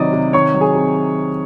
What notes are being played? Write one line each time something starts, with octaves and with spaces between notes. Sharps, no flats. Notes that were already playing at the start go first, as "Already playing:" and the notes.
Already playing: C3 D#3 F#3 D5 D#5 D#6
C3
D#3 C#5 C#6
F#3
G#4 G#5
C3